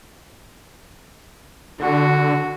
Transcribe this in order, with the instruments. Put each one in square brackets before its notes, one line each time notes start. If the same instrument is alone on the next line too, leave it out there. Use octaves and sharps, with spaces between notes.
[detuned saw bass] D3 [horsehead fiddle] F#4